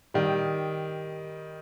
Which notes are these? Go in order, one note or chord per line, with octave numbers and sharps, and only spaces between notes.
D#3 G3